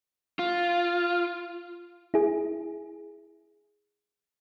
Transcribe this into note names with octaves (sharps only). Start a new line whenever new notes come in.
F4
E4 G#4